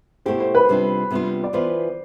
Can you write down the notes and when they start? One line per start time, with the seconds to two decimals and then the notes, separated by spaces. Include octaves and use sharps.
0.26 B2 A3 E4 G4 C5
0.40 C5
0.55 B4
0.69 C3 G3 D4 F4
1.11 C3 G3 B3 D4 F4
1.44 D5
1.53 E3 B3 F4 B4 C5